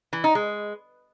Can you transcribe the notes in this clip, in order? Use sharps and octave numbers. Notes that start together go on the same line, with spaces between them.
E3
D#4
G#3